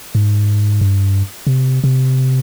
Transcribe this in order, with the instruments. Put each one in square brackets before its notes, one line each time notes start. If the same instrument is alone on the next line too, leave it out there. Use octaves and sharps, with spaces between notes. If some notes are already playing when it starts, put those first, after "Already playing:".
[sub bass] G#2
G2
C3
C3